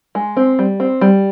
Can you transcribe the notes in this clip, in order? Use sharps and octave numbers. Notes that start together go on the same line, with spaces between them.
G#3
C4
G3
C4
G3